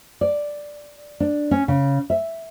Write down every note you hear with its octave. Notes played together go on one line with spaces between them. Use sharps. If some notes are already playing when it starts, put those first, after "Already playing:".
D5
D4
C#4
C#3
E5